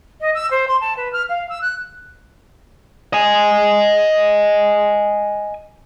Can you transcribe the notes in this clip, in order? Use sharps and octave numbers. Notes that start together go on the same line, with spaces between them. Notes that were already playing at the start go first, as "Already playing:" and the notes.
D#5
E6
C5
C6
A5
B4
F6
F5
E6
F#6
D#5 G#5